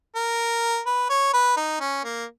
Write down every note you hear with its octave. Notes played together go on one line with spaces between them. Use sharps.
A#4
B4
C#5
B4
D#4
C#4
A#3